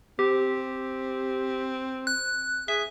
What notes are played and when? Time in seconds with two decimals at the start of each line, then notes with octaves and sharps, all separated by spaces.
0.19 C4 G4
2.07 F#6
2.68 G#4 E5